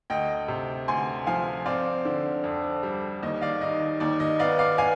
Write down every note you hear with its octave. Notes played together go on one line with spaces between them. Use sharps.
D2 D#5 G5
C3
D2 G#5 C6
F3 F5 G#5
C4 D5 F5
D3
F2
G3
D#2 D#5
D5 F5
D#3 D#5
D#2 D5
D#5
B3 D5 F5
D5 F5
B3 F5 G#5